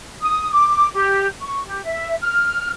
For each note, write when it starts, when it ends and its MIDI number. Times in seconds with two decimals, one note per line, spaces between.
0.22 0.50 87
0.53 0.88 86
0.94 1.27 67
1.41 1.62 85
1.66 1.80 67
1.86 2.14 76
2.21 2.70 89